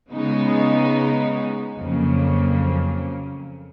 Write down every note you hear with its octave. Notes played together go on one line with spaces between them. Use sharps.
C#3 G#3 B3 D#4
F2 C#3 F#3 A#3